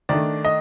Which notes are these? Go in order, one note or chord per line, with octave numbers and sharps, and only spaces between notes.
D#3 A3 D4 D5
D#5